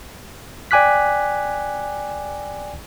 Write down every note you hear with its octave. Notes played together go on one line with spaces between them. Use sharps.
D5 G5 G#5 D6 F#6 B6